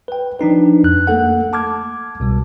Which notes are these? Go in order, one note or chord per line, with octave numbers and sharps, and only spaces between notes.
B4 G5
F3 D4 D#4 B4
F2 F#6
A3 A#3 A4 F#5
A5 D6 F6 G#6
C2 B2 G3